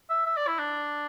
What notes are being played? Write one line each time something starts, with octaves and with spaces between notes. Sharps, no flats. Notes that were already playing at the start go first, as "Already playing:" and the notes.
E5
E5
D5
E4
D4